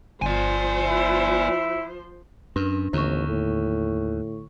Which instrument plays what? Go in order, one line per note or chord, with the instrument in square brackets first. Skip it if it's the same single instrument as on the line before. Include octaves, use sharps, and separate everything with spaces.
[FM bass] G1 [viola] F3 C5 [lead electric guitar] D5 G#5
[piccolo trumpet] E4
[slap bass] F#2 [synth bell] D4
[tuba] A1 [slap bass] D#2 [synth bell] D3 C#6
[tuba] A2